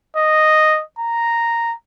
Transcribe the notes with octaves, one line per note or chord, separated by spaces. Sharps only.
D#5
A#5